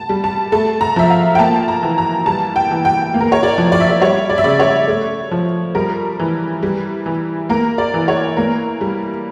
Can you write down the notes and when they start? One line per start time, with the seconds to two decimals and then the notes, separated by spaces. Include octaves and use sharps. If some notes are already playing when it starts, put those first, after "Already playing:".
Already playing: A5
0.09 G3
0.24 A5
0.52 A3 A5
0.81 A#5
0.96 F3 E5
1.10 F5
1.35 G5
1.39 A#3 A5
1.68 A#5
1.83 E3
1.98 A#5
2.26 G3 A5
2.56 G5
2.71 E3
2.85 G5
3.14 A#3
3.21 A#4
3.32 C#5
3.43 D5
3.58 F3
3.72 D5
3.80 E5
3.89 D5
4.01 G3 C#5
4.30 D5
4.38 E5
4.44 C#3 D5
4.60 C#5
4.88 A3
5.31 F3
5.75 G3 A#4
6.19 E3
6.63 G3
7.06 E3
7.49 A#3 A#4
7.78 D5
7.94 E3
8.08 C#5
8.37 A#3 A#4
8.81 G3